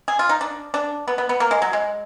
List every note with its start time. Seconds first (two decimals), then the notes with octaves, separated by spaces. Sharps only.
0.08 G#4
0.19 F4
0.29 D#4
0.41 D4
0.74 D4
1.08 B3
1.18 B3
1.29 B3
1.40 A#3
1.51 G#3
1.62 F#3
1.73 G#3